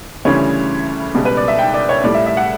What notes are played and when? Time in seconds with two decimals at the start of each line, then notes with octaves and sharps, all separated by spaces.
0.25 D2 C#3 E3 G3 C#5
1.15 C#2 B2 G3
1.25 B4
1.37 D5
1.48 E5
1.59 G5
1.74 D5
1.89 C#5
2.04 A2 G3 D5
2.15 E5
2.26 E5
2.37 F#5